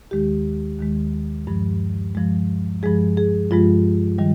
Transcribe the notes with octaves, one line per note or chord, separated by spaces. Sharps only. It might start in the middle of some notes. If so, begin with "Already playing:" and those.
D#2 D#3 G#3 G4
D#2 D#3 G#3
G2 F3 G#3
G2 F3 G#3
G2 F3 G#3 G#4
G#4
G2 F3 G#3 F4
D#3 G3